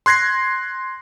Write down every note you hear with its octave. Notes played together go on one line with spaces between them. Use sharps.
C6 F#6 G#6 A#6 C7